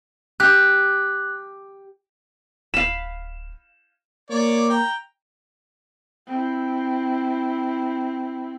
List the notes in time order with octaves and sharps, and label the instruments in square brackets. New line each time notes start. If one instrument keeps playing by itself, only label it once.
[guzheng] G4 [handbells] F#6
[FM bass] D1 [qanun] F5 B5 [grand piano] E7
[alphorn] A#3 [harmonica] C#5 D5 D6
[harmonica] G5 A#5
[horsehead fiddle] C4 E4